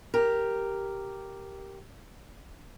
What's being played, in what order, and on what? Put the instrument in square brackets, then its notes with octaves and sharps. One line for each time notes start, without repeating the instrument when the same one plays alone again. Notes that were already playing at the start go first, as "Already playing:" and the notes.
[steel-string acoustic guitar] G4 A#4